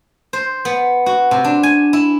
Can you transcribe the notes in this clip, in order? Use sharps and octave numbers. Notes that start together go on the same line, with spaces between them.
C5
B3
F#4
C3
D4
G#5
E4